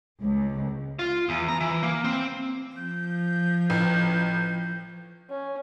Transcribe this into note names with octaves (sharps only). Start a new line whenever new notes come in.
C#2
F4
E2
A#5
E3
A#3
C4
F3 G6
A1
C#4